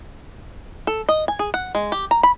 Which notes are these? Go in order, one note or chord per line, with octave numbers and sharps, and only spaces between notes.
A4
D#5
G#5
G#4
F#5
G#3
G4
A#5
B5